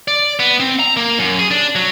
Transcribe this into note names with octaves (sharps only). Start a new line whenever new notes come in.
D5
B3
C4
A#5
A#3
F#2
G#4
D4
F#3